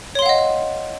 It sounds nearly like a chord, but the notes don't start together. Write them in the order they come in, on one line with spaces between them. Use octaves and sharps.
C#5 C6 F5 F#5 D#5